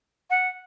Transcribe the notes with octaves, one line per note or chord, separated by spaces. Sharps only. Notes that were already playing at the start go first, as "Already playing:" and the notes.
F#5